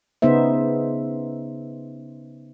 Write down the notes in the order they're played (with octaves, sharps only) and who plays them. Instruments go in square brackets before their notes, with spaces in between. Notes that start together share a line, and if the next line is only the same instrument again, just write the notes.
[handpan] C#3 B3 D#4 C5 E5